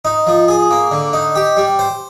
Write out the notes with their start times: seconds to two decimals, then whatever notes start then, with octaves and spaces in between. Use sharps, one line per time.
0.05 D#4
0.27 F3
0.48 G#4
0.71 A#3
0.91 D3
1.13 D#4
1.36 G4
1.57 G3
1.79 C5